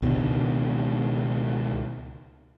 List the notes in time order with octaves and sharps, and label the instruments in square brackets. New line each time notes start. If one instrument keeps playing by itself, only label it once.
[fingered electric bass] C#2 B2 D3 D#3